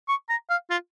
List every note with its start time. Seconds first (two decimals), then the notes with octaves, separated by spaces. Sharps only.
0.09 C#6
0.30 A#5
0.50 F5
0.70 F4